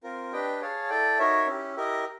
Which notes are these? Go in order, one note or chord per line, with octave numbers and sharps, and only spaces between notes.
C4 F4 A#4
D4 G4 B4 D#5 G5
G#4 C#5 F5 A5
E4 A4 D5 G5
D#4 F#4 A#4 C#5 E5
C#4 E4 G4
E4 G4 A#4 D#5